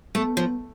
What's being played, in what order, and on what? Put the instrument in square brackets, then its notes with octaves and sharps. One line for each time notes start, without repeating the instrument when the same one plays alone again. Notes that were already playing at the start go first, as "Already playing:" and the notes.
[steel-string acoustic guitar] A3 [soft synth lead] B3
[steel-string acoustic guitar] F3